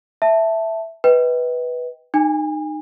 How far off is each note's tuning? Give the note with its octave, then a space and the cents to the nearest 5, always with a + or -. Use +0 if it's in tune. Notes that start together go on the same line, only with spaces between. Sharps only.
E5 +0 A5 +0
B4 +0 D#5 +35 G5 +0
D#4 -25 G#5 -35